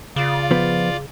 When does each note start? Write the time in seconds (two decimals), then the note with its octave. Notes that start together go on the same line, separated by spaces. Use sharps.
0.16 C#3 F4 D5
0.51 F3 B3